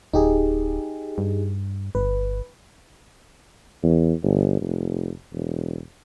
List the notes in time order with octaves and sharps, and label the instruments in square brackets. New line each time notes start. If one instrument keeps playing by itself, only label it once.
[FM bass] D1 [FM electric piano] D#4 G4 G#4
[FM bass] G2
[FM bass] G1 [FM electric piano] B4
[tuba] E2
G1
F1
E1